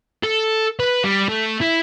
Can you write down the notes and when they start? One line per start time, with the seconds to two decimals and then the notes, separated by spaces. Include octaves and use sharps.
0.24 A4
0.80 B4
1.04 G3
1.29 A3
1.61 E4